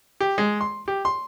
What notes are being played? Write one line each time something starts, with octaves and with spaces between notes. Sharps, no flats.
G4
G#3
C6
G4
C6